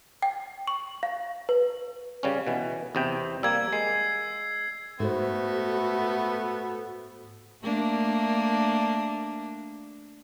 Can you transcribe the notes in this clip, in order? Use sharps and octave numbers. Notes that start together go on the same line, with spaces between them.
G5
C#6
F5
B4
C#3 G3 C#4
B2 E3
E2 C3 G5
G3 A#3 E6 G#6
G#3 C7
G#2 A3 B3 F#4 A4 C5
A3 A#3 D4